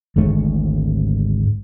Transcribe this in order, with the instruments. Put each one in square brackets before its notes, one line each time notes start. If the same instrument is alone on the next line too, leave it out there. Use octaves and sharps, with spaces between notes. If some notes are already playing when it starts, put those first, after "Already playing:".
[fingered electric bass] G#1 D2 G#2 A3